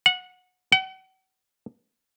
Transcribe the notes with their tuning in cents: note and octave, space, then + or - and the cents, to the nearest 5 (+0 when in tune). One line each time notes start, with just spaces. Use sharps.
F#5 -20
F#5 +40